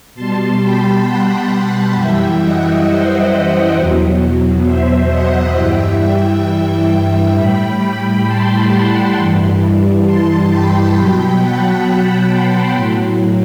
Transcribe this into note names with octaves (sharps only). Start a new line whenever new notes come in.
B2 G3 A5 C6
G5 B5
F#5 A5
F#5 A5
F#2 E3 G3 E5 G5
D#5 F#5
C5 E5
E2 B2 F#3
C5 E5
D#5 F#5
G2 E3 G3 E5 G5
E5 G5
A2 G3 G5 B5
A5 C6
F#5 A5
G2 E3 G3
A5 C6
G5 B5
B2 F#3 G5 B5
F#5 A5
A5 C6
A2 F#3